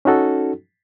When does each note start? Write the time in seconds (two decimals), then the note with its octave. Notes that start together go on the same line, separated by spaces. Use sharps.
0.05 C#4 D#4 F#4 A4